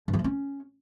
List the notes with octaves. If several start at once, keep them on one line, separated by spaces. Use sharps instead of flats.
G2
F3
A3
C#4